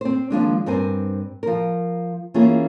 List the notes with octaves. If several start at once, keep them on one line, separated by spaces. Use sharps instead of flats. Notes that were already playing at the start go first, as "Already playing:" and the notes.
C4 C5
D#2 F3 G#3 D4
G2 C4 A#4 C5 G#5
F3 A#4
E3 A#3 C#4 F4 G#4